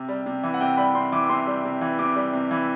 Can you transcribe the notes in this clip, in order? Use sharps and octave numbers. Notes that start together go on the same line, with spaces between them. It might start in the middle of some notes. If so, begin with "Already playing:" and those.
Already playing: C3
G3
C3
E3
F#5
C3 G5
G3 B5
C3 C6
E3 D6
C3 C6
G3
C3
E3
C3 D6
G3
C3
E3